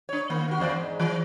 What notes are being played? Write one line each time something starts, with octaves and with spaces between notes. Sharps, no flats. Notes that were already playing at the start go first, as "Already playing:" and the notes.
D4 C#5
D#3 A#3
D#2 F#4
E2 C5 D5
G#2
E3